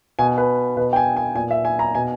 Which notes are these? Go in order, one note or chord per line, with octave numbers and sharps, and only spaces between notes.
B2 G#5
B4
B2 B4
G5
G#5
G#5
A#2 G#5
E5
G#5
A#5
B2 G#5